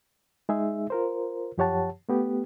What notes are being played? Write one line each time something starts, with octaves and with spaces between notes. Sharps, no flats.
G#3 D#4 G#4 E5
F4 A#4 C5
F#2 F3 G4 C#5 F#5 A5
A3 B3 G4